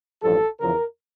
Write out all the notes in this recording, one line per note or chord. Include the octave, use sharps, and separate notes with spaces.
A1 G2 F3 A4
E2 C#3 F3 A#4